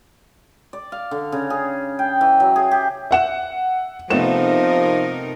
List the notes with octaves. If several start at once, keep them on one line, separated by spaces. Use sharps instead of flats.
D5
F5
D3
C#3
G#4
G5
E3
F#3
G#4
G4
E5 F#5 E7
C3 F3 A3 B3 C4 D#4 A#4 E7